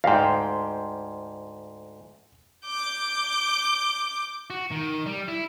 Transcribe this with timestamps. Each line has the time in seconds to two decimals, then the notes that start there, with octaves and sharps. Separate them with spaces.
0.04 D2 G#2 F5 G5
2.66 D6 G6
4.50 F#4
4.72 D#3
5.06 G3
5.28 E4